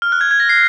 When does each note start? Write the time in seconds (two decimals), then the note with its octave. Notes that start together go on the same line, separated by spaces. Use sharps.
0.02 F6
0.12 F#6
0.21 G#6
0.31 G#6
0.40 A#6
0.49 C7